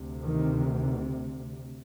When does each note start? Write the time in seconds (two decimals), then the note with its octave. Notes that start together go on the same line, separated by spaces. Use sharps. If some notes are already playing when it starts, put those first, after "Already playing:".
Already playing: D2 C3
0.24 D#3